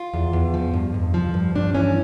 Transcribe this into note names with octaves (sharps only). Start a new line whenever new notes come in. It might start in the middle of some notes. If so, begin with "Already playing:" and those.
Already playing: F4
E2
E2
F3
G2
F2
F3
G2
G2 D4
E3 C#4